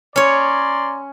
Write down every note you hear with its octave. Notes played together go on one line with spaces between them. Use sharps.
C#4 C#5 D5 A#5 C6